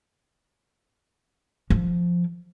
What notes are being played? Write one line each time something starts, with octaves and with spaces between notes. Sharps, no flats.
F3